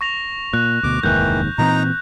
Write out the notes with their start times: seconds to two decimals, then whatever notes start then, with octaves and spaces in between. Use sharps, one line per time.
0.01 C#6 A#6 F7
0.53 A#2 F#6
0.83 D2 B2 D6
1.03 F1 D#2 G#2 D#3 E3 F#6 G6
1.58 A#2 E3 C4 D#4 A#5